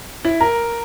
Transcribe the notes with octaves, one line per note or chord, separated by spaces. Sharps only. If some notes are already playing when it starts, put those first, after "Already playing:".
E4
A#4